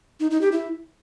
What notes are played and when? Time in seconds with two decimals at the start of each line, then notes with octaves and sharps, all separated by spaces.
0.20 D#4
0.31 D#4
0.41 G4
0.52 E4